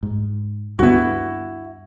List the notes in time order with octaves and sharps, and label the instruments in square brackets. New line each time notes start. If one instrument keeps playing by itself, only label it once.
[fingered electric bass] G#2
[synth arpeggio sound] D2 D3 B3 [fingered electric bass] G2 [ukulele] E4 F#4